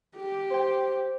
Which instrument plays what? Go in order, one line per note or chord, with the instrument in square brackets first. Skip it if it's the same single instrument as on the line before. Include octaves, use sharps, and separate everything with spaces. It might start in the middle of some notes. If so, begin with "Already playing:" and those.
[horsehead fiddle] G4
[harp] C5 G5